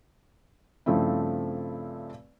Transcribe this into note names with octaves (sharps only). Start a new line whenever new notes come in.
G2 C#3 F3 A3 C4 E4